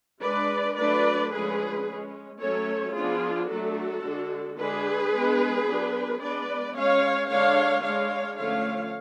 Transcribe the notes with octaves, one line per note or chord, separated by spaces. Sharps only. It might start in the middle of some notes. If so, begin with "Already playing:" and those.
G#3 D4 B4 D5
F#3 A3 D4 B4 D5
D3 F3 G#3 C#4 G#4 B4
G#3 C#4
F#3 A3 C#4 A4 C#5
F3 B3 D4 F4 G#4
F#3 A3 D4 F#4 A4
D3 G#3 D4
D3 G#3 D4 G#4 B4
G#3 B3 D4
F#3 B3 D4
G#3 B3 D4 B4 D5
G#3 C#4 C#5 F5
D3 G#3 D4 C#5 F5
G#3 D4 C#5 F5
D3 F3 A3 C#4 C#5 F5